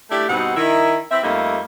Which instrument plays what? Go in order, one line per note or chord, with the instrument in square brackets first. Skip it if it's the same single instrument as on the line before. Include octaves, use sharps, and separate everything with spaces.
[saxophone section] A3 D4 E4 G4
G2 B2 C4 D#4 F#5
D#3 E4
C4 E4 E5
F2 G3 A3 A#3 D#4